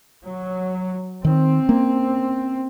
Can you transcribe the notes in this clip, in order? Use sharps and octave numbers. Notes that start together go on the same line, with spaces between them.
F#3
D#3 C4
A#3 C#4